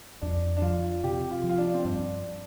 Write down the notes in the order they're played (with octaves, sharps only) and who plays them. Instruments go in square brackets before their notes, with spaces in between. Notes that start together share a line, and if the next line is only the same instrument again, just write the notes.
[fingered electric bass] F2 [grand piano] D4
[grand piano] D4
[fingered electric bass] F3 [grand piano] F4
[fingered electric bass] C3 [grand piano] G4
[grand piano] F4
[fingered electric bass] F3
[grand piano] F4
D4
C4
[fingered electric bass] G2 [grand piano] D4